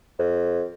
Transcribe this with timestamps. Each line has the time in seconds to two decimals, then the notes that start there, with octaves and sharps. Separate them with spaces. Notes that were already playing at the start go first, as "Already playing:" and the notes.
0.19 F2